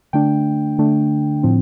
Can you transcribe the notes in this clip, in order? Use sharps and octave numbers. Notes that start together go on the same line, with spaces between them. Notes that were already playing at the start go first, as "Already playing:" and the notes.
D3 A3 D4 G5
D3 A3 D4
A2 F3 C4